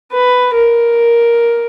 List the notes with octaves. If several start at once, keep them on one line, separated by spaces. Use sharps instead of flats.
B4
A#4